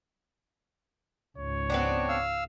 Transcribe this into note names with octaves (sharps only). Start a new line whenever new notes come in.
C#2 G#2 C#5
B3 C4 D4
F5 E6